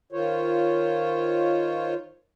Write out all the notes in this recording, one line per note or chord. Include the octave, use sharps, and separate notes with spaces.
D#3 F4 C5 C#5